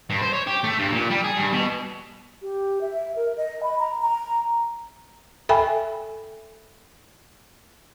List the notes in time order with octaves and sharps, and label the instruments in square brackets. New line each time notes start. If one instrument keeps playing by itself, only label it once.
[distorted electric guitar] G2
C5
C#5
G4
A3
G2
A#2
G3
G#4
G2
B2
[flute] G4
E5
A#4
D#5
B5
A#5
A#5
[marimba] A4 E5 G5 G#5 B5